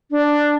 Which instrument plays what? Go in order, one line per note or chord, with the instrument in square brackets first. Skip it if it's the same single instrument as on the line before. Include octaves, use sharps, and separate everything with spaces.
[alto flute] D4